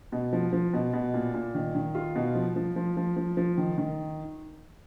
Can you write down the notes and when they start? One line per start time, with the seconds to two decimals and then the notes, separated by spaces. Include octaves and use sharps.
0.12 B2
0.33 F3
0.53 F3
0.73 B2
0.93 B2
1.14 A#2
1.34 A#2
1.55 D#3
1.75 D#3
1.95 F4
2.15 B2
2.35 F3
2.56 F3
2.76 F3
2.97 F3
3.16 F3
3.37 F3
3.57 D#3
3.78 D#3